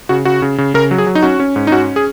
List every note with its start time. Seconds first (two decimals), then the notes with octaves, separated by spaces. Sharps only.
0.09 C#3 F#4
0.25 C#3 F#4
0.42 C#3
0.58 C#3
0.74 C#3 A#4
0.91 F#3
0.98 G#4
1.07 F#3
1.15 D#4
1.23 C#4 F#4
1.40 C#4
1.56 G#2
1.67 D#4
1.72 C#4 F#4
1.96 G#4